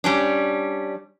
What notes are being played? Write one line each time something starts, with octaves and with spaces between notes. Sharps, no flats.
G3 C#4 D4